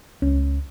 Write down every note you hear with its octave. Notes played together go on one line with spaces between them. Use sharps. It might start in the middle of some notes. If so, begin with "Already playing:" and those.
C#2 C#4